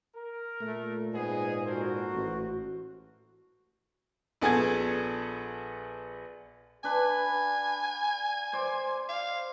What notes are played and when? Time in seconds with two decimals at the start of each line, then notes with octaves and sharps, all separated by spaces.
0.15 A#4
0.61 A#2 A3
1.13 G#2 B3 G#4 D#5
1.67 F#4 A4 A#4 C5
2.14 A1
4.41 A#1 B3 G#4 A4 G#6
6.84 D4 B4 G#5
8.53 C5 D5
9.09 F5